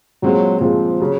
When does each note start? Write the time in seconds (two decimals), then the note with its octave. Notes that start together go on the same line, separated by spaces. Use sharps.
0.23 A#2 F#3 G#3 C4
0.61 A#2 F3 G#3 C4
1.00 C#3 F#3